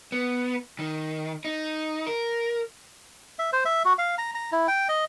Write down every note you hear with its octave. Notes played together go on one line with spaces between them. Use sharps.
B3
D#3
D#4
A#4
E5
C5
E5
F#4
F5
A#5
A#5
E4
G5
D#5